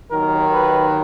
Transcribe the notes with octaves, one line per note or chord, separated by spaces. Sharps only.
D#2 D#3 F#3 A#4
B4